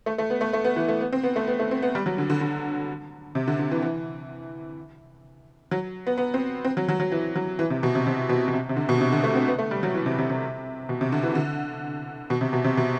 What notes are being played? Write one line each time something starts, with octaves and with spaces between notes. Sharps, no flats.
A3
A3
B3
A3
A3
B3
E3
A3
B3
C4
B3
A3
B3
A3
C4
B3
G3
F#3
D3
D3
D3
C3
D3
D3
E3
E3
F#3
B3
B3
C4
C4
F#3
F#3
F#3
E3
F#3
E3
C3
B2
C3
C3
B2
B2
C3
C3
D3
B2
C3
D3
A3
C4
B3
A3
G3
F#3
E3
C3
C3
C3
B2
C3
D3
E3
D3
B2
C3
B2
C3
B2